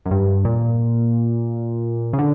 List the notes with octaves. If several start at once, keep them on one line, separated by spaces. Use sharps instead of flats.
F#2
G2
A#2
C#3
D3